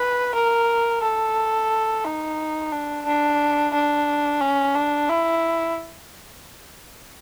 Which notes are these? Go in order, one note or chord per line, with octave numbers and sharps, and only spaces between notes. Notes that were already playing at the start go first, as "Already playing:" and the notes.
Already playing: B4
A#4
A4
D#4
D4
D4
D4
C#4
D4
E4